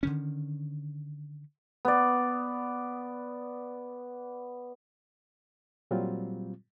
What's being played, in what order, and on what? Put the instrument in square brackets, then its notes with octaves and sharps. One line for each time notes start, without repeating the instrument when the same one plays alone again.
[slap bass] D3 D#3 C#4
[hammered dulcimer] B3 D5
[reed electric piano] A#2 F#3 G3 C4 F4